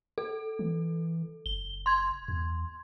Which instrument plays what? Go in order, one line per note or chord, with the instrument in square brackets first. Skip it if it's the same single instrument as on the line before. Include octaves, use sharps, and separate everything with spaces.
[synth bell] A4
[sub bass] E3
[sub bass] F#1 [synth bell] G7
[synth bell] C6 G#6
[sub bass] E2